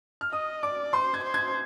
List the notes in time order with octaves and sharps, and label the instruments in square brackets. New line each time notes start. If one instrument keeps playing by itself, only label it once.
[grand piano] F6
[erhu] D#5 [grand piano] D#6
[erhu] D5 [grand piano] D6
[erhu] C5 [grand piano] C6
[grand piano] G#6
[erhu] C5
[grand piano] G#6